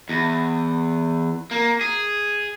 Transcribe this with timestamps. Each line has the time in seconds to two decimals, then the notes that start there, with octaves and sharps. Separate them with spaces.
0.09 E2
1.51 A#3
1.81 G#4